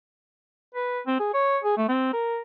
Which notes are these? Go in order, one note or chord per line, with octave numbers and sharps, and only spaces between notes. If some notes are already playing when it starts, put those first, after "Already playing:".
B4
C4
G#4
C#5
G#4
A3
C4
A#4